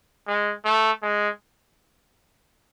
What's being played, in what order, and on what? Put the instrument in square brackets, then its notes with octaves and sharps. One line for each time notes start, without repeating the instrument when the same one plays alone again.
[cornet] G#3
A3
G#3